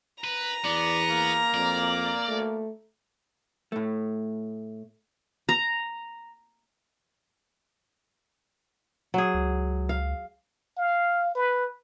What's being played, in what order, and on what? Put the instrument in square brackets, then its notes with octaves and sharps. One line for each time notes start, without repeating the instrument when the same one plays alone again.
[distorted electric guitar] B4 [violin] A#5
[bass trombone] E2 [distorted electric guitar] B3 [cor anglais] D5
[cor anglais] A#3
[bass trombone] F2 [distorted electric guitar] D5
[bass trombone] A3
[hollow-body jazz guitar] A2 A3
[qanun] A#5
[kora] F#3 G#4
[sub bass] C#2
[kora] F5
[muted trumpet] F5
B4